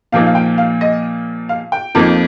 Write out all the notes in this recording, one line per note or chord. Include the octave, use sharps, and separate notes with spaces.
A#2 F3 A#3 D#4 F5
F5
G5
F5
D#5
F5
G5
F2 F3 A#3 D#4